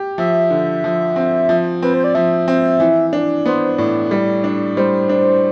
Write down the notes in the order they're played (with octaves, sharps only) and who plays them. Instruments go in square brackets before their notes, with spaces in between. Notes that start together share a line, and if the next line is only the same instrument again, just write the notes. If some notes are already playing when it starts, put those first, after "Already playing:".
Already playing: [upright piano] G4
[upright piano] F3 [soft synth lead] E5
[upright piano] D3
F3
C4
F3
[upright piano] C4 [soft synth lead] B4
[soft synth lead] C5
D5
[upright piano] F3 [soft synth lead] E5
[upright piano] C4
E3
D4
[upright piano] B3 [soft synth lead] C5
[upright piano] A2 [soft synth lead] D5
[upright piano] G3
D4
[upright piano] G3 [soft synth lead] C5
[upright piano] D4